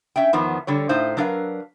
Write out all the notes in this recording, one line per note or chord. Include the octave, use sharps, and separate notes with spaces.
C#4 E5 G5
E2 D#3 F3 B3
D3 G3 C#5
A2 D#4 C5 F5
F#3 D4 A#4 B4 F5